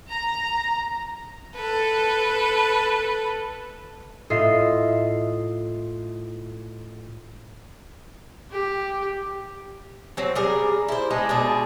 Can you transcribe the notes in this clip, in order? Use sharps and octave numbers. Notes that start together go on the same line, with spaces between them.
A#5
A4 B4
A2 F4 D#5 E5 D#6 C7
G4
F#3 C4
G3 G#4 A#4
E4 C5
G#3 B3 D4 D#4
B2 D4 G#4